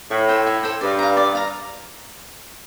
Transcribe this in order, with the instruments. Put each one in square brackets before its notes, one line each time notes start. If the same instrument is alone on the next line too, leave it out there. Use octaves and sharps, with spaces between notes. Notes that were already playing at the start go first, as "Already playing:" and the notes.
[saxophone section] A2 [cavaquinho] E4
[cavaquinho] A4 C5 G5
E4
A4 C5 G5
[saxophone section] G2 [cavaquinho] D5
[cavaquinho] F5 A#5
D5
F5 A#5